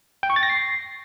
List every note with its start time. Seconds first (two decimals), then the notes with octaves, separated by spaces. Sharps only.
0.23 G5
0.30 C#6
0.36 A6
0.43 A#6
0.49 C7